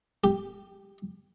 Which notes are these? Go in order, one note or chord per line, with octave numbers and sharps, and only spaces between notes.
G4